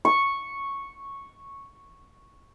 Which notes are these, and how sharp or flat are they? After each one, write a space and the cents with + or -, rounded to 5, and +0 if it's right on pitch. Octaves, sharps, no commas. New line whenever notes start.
C#6 -5